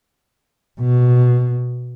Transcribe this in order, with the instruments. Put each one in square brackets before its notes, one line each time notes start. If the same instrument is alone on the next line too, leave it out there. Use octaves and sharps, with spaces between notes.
[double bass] B2